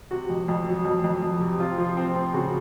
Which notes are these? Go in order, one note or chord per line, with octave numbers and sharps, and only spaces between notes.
C3 F#4
F2
F2
F#3
F2
F2
F2
C3
C4 F4
F3
C4
C4
C#3 F#4